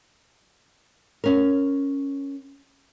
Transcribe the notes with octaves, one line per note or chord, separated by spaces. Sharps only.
C#4 A#4